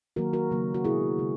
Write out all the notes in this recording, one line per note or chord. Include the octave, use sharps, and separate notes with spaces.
D#3 F#3 A#3 F#4 A#4
F#4 A#4
C#3 F#3 A#3
F#4
B2 G#3 E4 G#4
C#3 G#3